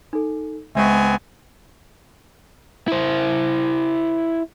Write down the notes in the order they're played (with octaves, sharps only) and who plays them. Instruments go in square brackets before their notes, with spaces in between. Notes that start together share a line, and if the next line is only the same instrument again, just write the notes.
[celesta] D#4 A4
[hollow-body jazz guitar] C#2 G#3 D#5 [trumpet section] B3 C4 G#5 [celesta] E5 C#6
[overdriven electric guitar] E4 C5